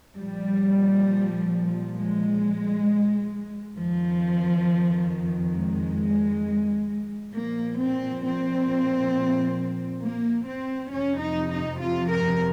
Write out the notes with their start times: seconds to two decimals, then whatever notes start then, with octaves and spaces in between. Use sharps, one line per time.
0.19 A#2 F3 G3
1.98 G#3
3.77 F2 D#3 F3
5.55 G#3
7.34 A#2 F3 A#3
7.79 C4
8.24 C4
10.03 A#3
10.47 C4
10.92 F2 C3 F3 C#4
11.22 D#4
11.52 D#4
11.81 F4
12.11 A#4